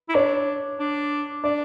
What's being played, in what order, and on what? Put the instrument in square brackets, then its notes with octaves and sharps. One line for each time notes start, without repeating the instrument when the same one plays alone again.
[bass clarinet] E4
[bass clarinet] D4 [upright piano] C#5
[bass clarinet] D4
[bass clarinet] D4 [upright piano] D5